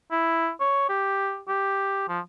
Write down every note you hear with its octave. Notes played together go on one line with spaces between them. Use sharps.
E4
C#5
G4
G4
F3